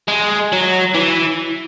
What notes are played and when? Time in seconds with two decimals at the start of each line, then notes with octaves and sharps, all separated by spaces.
0.08 G#3
0.52 F#3
0.95 E3